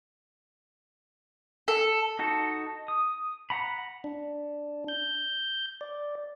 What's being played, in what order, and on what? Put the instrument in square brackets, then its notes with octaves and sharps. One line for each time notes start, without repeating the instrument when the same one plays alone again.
[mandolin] A4
[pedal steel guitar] D#4 F#4 A4
D#6
F#5 A#5 B5
[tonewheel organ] D4
G6
D5